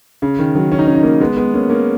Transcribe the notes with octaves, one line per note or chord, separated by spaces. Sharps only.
C#3
D#3
D#3 F#3
C#4
D#4
C#4
D#4
A#3 C#4
G#3 B3
G#3 B3
A#3 C#4
A#3 C#4